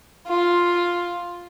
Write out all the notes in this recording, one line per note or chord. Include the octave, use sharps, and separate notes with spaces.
F4